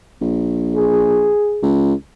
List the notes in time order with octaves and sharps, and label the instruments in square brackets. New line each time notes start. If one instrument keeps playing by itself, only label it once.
[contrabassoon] A#1
[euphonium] G#4
[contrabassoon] C#2